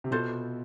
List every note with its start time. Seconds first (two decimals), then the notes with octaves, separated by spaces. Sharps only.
0.04 C3
0.11 B2 F4 A4 C5